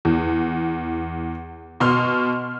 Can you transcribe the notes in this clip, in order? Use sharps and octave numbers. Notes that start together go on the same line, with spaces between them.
E2
B2 C6 F6